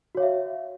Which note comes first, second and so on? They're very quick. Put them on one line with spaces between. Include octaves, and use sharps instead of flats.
F#4 C#5 F5 E5